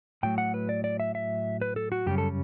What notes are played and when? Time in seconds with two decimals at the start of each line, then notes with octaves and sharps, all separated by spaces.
0.23 A2 F#3 A3 G5
0.38 F#5
0.54 B4
0.69 D5
0.84 D5
1.00 E5
1.15 E5
1.61 B4
1.76 A4
1.92 F#4
2.06 F#2 C#3 G3 C#4 G4
2.18 A4